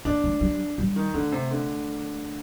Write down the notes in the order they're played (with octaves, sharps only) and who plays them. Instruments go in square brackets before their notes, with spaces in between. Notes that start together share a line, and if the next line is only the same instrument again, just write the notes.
[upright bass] A#3 [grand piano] D4
[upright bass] A3
G3
G3
[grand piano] D#3
[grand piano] D3 [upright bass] A3
[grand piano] C3
D3